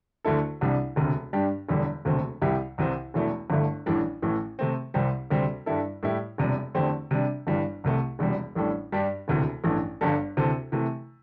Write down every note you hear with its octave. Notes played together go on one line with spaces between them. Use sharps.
D2 D3 A3 E4 A4
C2 C3 E3 G3 D4
E1 D2 C3
G2 G3 D4 G4
E1 E2 D3 G3
E1 D2 C3 A3 C4
C2 C3 G3 E4 G4
C2 C3 E3 C4
E1 E2 E3 A3 E4
G1 G2 D3 A3 E4
A1 A2 E3 G3 D4
A1 A2 E3 A3
C3 A3 C4
C2 C3 G3 C4
D2 C3 G3 C4
G2 G3 E4 A4
A2 G3 E4 G4
E1 E2 C3 G3
E2 D3 A3 C4 G4
C3 G3 D4
G1 G2 E3 G3
C2 C3 A3
E1 E2 C3 G3
A1 A2 G3 D4 A4
G2 G3 D4 G4
E1 D2 C3 E3
A1 G2 E3 A3
G1 G2 G3 D4 A4
D2 C3 E3 C4 A4
C3 E3 A3